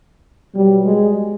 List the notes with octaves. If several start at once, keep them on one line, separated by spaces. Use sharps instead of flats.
B2 F#3 G3
G#3